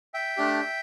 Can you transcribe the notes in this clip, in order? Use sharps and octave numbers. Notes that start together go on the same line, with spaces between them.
E5 G5
A3 D4 G4